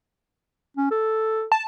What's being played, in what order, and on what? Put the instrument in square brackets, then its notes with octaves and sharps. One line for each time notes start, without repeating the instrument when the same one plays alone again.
[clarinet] C#4
A4
[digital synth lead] A5